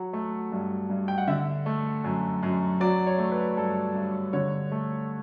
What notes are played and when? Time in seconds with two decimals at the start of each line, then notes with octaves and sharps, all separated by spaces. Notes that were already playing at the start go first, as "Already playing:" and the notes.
Already playing: F#3 F#5
0.13 A3
0.52 G2
0.90 G2
1.08 G5
1.18 F#5
1.28 D3 E5
1.66 A3
2.04 F#2
2.43 F#2
2.80 F#3 D5
3.07 C#5
3.18 A3
3.32 B4
3.57 G2 A4
3.95 G2
4.33 D3 C#5
4.72 A3